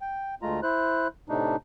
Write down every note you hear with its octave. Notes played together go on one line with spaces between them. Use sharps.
G5
D2 G#3 A3 F4 A#5
E4 C5 F#6
A2 C3 A3 D4 D#4